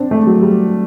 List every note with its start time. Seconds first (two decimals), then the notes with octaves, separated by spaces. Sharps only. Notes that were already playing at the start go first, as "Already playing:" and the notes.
Already playing: C4 D4
0.11 A3
0.27 F#3
0.42 G3